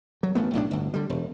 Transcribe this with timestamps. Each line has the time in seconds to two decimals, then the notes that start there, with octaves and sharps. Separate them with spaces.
0.23 F#3
0.35 A1 A3 B3
0.53 B1 A2 D#3 D4
0.71 G1 D2
0.94 D3 G3
1.10 E1